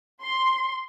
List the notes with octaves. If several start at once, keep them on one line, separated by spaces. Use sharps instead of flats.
C6